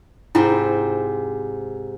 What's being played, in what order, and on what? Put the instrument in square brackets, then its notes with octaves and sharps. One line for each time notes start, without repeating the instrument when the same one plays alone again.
[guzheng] G#2 C3 [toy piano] E4 F4